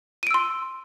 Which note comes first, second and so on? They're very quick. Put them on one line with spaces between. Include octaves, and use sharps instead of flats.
D#7 D7 E6 C6